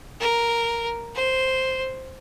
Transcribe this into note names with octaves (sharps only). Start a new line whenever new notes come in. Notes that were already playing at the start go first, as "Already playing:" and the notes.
A#4
C5